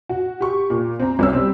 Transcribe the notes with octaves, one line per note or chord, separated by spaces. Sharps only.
F#4
G4 C#6
A#2
C4 A#5
C2 C#4 E6
G3 C4